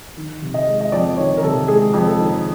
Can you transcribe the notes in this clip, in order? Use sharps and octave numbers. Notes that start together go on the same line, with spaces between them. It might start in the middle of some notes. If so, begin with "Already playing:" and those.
D#3
C3
D#5
G#3
D#5
F2 D5
D#3 C#5
A#4
C3 A4
G#3 G#4
F2
A4
D#3